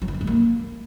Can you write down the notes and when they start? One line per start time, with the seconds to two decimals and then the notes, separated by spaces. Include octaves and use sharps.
0.02 F#3
0.08 E3
0.14 F3
0.21 G#3
0.27 A#3